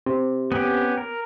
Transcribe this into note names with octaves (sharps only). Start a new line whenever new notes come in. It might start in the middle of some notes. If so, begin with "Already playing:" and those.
C3
B3 C#4 G4
A#4